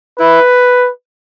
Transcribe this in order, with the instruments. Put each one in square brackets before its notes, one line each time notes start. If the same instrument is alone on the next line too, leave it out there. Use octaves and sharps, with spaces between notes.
[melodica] E4 [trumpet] B4